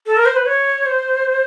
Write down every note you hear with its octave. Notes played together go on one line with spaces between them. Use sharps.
A4
A#4
C5
B4
C#5
C5